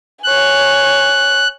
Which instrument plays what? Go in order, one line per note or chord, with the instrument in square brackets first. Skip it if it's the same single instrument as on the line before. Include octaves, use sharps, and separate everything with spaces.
[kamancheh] C#5 G#5 [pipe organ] F#6